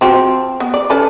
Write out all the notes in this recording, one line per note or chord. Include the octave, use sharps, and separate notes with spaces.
F3 C4 F#4
B3
D5
C#4 A4 B4